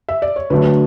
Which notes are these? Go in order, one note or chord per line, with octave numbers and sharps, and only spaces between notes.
E5
D5
C#5
D3 F#3 A3 B4